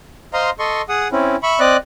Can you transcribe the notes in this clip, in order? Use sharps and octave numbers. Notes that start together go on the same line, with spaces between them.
C5 D#5 F5 A#5 C6
A4 D#5 C6 C#6
G#4 F#5 D#6
C4 C#4 E4
E5 B5 C#6
C4 D5 D#5 F#6